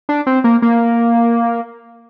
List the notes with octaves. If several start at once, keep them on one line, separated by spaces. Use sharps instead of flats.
D4
C4
A#3
A#3